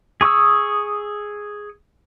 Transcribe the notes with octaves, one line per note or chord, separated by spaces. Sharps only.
G#4 C#6 D#6 E6